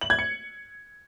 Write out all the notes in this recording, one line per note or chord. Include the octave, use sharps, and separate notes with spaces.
F#7
G#6
C#7